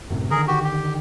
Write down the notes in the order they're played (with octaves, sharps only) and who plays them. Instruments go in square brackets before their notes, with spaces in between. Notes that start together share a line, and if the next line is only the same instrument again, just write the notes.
[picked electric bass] F#2 A2 C3
[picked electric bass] D3 D#3 [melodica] G#4 A#4
[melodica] F#4 G4
G4